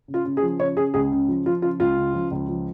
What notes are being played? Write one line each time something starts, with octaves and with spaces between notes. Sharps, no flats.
C#3
F4
C#3
G#4
F3
C#3 C#5
C#3 G#4
C#2 G#4
C#3
F3
F3 F4
C#3 F4
C#2 F4
C#3
F3
C#2
F3